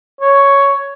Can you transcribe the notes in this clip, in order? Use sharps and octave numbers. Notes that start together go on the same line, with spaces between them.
C#5